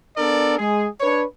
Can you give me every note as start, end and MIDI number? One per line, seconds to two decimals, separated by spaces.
0.17 0.55 59
0.17 0.55 62
0.17 0.55 69
0.17 0.55 70
0.17 0.55 74
0.58 0.86 56
0.58 0.86 68
1.00 1.23 62
1.00 1.23 71
1.00 1.23 73